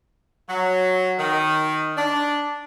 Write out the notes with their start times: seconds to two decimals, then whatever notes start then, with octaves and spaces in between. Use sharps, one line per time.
0.49 F#3
1.18 D#3
1.96 D4